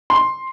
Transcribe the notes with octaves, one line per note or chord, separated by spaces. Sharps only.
C6